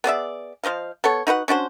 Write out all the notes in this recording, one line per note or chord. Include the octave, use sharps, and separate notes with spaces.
B3 G#4 D5 E5
F3 C5 D#5 F5
B3 A4 C#5
D#4 F#4 B4 F#5
C#4 D4 F#4 C5